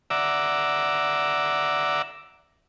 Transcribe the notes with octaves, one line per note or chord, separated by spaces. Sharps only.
D5 E5 F#5 A#5 D6 E6